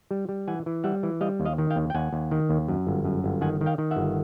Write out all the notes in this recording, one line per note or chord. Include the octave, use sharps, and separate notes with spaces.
G3
G3
E3 F#5 G#5
E3
G3 E5 F#5
E3
G3 D#5 F5
D#2
D#5 F5
D#3
F5 G5
D#2
G5
D#2 F#5 G#5
D#2
D#3
D#2
F#2
G1
F#2
G1
D#3 F#5 G#5
D#3
F5 G5
D#3
E5 F#5
G1